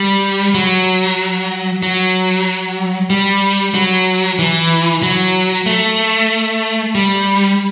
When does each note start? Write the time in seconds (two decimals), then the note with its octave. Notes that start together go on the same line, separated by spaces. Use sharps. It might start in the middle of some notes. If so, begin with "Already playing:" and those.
Already playing: G3
0.55 F#3
1.83 F#3
3.10 G3
3.74 F#3
4.39 E3
5.03 F#3
5.66 A3
6.95 G3